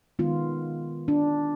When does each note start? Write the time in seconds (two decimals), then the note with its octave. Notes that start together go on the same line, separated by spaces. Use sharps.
0.19 D#3 G#3 B3 F4
1.08 D4